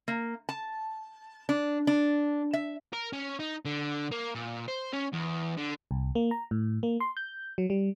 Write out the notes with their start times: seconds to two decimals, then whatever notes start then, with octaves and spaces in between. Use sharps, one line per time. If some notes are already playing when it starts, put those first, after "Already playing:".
0.08 A#3
0.49 A5
1.49 D4
1.87 D4
2.53 E5
2.93 A#4
3.13 C#4
3.39 D#4
3.65 D3
4.12 A#3
4.35 A#2
4.68 C5
4.93 C#4
5.13 E2
5.57 D3
5.91 C2
6.15 A#3
6.31 A#5
6.51 A2
6.83 A#3
7.00 C6
7.17 G6
7.58 F#3
7.70 G3